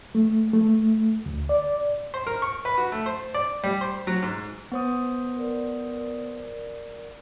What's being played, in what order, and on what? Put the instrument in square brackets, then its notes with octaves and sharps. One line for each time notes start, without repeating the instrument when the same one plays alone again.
[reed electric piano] A3
A3
D2
D5
[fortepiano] C5
A#4
C#6
B4
F#4
A3
C5
D5
G3
C5
F#3
G#2
[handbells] B3 C5 D#6
[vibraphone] A#4 D5